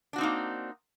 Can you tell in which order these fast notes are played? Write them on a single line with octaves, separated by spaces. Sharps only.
D4 F#4 C4 D#4 A#3